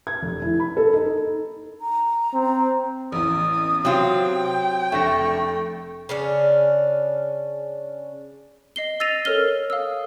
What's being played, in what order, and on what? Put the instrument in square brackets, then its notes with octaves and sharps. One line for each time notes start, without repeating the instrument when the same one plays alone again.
[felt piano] G#6
F1
E4
B5
A4
D#4
[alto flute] A#5
[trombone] C4
[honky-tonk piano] A1 E2 [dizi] D#6
[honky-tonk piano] C3 [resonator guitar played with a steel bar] F#3 C4 F4 [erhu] G5
[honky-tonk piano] F1 D4 A#6 [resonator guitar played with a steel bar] A3 [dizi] C#6
[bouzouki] C#3 C#4 D4
[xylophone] D#5 C7 G7
E6 A6 A#6 C7 D#7 F7
A4 A#4 C#5 F6 G7
F5 D#6 E6